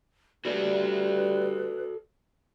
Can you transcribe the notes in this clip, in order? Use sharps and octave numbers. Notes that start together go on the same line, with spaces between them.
G3 F#4 A4 B4 D5